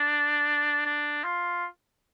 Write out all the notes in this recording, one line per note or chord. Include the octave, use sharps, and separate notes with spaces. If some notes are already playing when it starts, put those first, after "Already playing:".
Already playing: D4
D4
F4